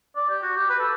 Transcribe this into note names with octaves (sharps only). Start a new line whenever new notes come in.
D5
G4
F#4
G4
B4
A4